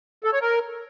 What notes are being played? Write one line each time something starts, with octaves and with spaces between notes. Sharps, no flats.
A4
C#5
A#4